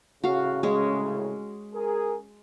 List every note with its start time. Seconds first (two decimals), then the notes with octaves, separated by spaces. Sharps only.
0.24 C2 A2 C#3 F#4 F5
0.63 G#3 C#4
1.74 G#4 A#4